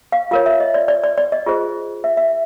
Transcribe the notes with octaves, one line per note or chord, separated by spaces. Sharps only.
F5
F4 A#4 C#5 F5
E5
D#5
D5
D5
D5
D5
D#5
F4 G#4 C5
E5
E5